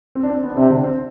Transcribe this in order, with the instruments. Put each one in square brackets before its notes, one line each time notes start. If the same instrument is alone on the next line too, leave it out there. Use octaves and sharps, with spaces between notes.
[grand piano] C4
D4
C4
B3
D4
[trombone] C3 [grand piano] C4
[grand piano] D3 D4
C4 C5